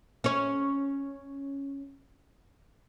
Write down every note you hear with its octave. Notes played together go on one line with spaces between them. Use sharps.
C#4 C#5